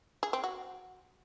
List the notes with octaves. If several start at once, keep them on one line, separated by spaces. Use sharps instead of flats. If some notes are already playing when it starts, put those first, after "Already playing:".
G#4
C4
F#4